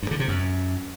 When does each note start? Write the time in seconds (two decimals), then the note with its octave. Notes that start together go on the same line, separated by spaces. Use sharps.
0.03 G2
0.11 D3
0.20 C3
0.28 F#2